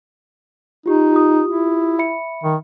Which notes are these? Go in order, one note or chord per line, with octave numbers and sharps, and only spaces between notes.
D#4 F4 G4
F4 G4 D#6
E4
E5 B5 C#7
D#3